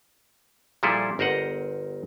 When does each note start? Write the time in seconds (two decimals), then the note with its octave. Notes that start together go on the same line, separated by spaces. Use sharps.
0.83 A#2 F3 G3 E4 G#4 A4
1.19 G1 A#4 C5 D#5 F#5